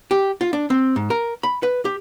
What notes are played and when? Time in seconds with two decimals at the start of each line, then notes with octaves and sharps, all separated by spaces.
0.11 G4
0.41 F4
0.53 D4
0.70 C4
0.96 G#2
1.10 A#4
1.43 B5
1.63 B4
1.85 G4